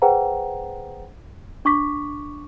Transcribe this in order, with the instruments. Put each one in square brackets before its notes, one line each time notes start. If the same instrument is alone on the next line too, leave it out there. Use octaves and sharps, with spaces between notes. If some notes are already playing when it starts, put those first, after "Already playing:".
[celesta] G#4 B4 C5 F#5 G5 A#5
D4 C#6 D6 B6